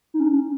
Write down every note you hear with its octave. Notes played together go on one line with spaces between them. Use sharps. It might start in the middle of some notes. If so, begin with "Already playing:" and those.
D#4
C#4